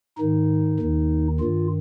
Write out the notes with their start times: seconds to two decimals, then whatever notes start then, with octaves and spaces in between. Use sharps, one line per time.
0.18 G#2 D#3 D#4
0.79 D#2 D#3
1.40 G2 D#3 F4